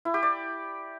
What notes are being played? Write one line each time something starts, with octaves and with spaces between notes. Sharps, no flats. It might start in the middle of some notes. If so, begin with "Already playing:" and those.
E4
G4
D5